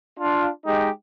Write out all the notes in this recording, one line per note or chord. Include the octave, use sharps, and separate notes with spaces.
D4 F4
G#3 D#4 G4